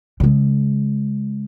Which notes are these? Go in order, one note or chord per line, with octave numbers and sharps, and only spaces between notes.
C#3 G#3